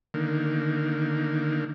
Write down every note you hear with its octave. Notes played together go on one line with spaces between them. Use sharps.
D3 D#3 A#3